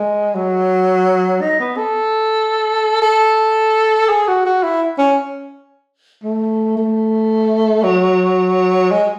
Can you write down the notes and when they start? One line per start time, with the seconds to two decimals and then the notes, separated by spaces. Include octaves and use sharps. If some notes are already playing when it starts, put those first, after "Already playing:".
Already playing: G#3
0.35 F#3
1.41 D#4
1.60 B3
1.77 A4
3.02 A4
4.09 G#4
4.28 F#4
4.46 F#4
4.63 E4
4.98 C#4
6.24 A3
6.78 A3
7.83 F#3
8.92 G#3